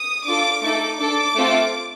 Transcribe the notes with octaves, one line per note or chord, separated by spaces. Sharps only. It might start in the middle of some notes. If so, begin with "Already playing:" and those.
Already playing: D#6
D4 F4 A4 D6
A3 D#4 A4 D6
D4 A4 D6
A3 C4 F4 A4